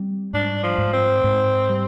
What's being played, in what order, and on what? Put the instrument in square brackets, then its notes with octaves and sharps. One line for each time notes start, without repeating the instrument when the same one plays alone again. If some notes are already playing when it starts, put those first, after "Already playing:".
Already playing: [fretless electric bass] G3 C4
[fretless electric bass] G#2 [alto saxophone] D4
[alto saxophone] F3
[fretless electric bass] G#2
[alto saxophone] C4
[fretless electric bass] G#2
G3